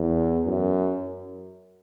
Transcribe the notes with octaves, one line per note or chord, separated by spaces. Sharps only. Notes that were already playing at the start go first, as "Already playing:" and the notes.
Already playing: E2
F#2